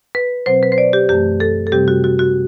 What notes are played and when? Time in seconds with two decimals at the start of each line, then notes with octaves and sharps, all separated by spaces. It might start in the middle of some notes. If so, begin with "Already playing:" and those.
0.15 B4
0.46 B2 F#3 C4 C5
0.63 B4
0.72 C5
0.78 D5
0.93 G4
1.09 F#2 E3 A3 G4
1.40 A4
1.67 A4
1.72 C3 G3 C4 G4
1.88 F#4
2.04 F#4
2.19 F#4